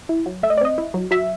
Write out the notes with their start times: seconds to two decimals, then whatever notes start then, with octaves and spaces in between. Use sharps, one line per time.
0.09 E4
0.26 F#3
0.43 A3 E5
0.50 D#5
0.57 D5
0.61 C4 D#5
0.78 E4
0.94 F#3
1.11 F#3 E5